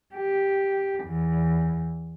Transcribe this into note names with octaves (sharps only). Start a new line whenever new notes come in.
G4
E2